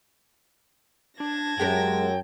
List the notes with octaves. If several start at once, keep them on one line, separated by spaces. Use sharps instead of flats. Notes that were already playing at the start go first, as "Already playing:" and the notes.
D4 A5 G#6 A#6
F#2 G#3 G4 A#4 G5